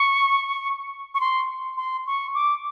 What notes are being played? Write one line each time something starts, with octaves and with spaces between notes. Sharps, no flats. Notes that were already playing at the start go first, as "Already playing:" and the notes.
Already playing: C#6
C#6
C6
C6
C#6
D6